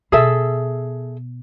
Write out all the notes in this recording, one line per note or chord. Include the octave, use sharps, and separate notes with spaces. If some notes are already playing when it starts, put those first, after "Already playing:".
B2 G#4 A4 E5